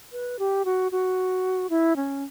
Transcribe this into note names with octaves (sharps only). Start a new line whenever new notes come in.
B4
G4
F#4
F#4
E4
C#4